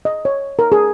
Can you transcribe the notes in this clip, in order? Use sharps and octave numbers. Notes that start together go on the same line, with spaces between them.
D#5
C#5
A#4
G#4